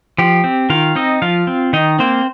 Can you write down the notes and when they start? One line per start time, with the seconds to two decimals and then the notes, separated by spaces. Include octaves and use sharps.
0.18 F3 G4
0.44 C4
0.70 D#3 F4 F5
0.95 C4 D#4 D#5
1.22 F3 F4 F5
1.47 C4
1.73 D#3 D#4 D#5
1.99 A#3 C4 C5